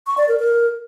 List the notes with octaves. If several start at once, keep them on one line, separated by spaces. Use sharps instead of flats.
C#6
D5
A#4
A#4